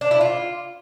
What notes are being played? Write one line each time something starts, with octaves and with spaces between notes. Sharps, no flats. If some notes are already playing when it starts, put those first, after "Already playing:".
D4
E4
F4